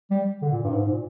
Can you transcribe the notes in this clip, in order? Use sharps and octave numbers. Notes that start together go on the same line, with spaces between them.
G3
D3
A#2
G2
G#2
G#2
A#2